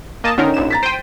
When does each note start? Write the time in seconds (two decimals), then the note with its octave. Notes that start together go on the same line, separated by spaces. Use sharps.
0.24 A#3 D#5 A5
0.38 D3 D#3 C#4 D#4 A#4
0.54 A#1 F#2 E7
0.70 A#5 A6 B6
0.83 C5 G5 D7 D#7